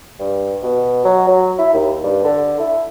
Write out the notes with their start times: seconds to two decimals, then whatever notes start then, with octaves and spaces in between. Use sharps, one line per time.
0.19 G2
0.63 B2
1.05 F#3
1.28 F#3
1.58 E4
1.73 D#2
2.04 G2
2.24 D3
2.59 E4